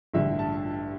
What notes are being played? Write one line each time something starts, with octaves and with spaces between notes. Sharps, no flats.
A1 G2 D3 E5
A5